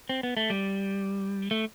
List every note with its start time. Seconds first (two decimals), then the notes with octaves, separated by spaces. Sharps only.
0.09 C4
0.23 B3
0.37 A3
0.50 G3
1.51 A3